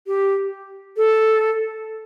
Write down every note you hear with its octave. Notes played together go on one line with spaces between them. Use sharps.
G4
A4